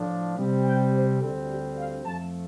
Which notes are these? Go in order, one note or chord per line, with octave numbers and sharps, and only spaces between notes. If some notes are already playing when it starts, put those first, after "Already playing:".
Already playing: A2 F3 D4
C3 G3 C4
G5
C5
D2 D3 G3 C4 A4
G4
F5
F2 F3 A3 A5